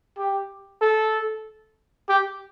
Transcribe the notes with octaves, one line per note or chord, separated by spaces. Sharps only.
G4
A4
G4